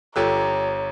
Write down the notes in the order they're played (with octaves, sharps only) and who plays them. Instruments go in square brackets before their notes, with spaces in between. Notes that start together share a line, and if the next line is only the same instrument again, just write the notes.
[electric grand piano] G1 G4 E6 [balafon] F4 A4 [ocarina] C#5 [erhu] A#5